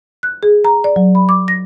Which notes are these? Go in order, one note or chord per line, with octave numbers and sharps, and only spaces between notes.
F#6
G#4
A#5
D5
F#3
B5
D6
A#6